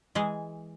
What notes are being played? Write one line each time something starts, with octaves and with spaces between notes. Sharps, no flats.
E3 G#3 G#4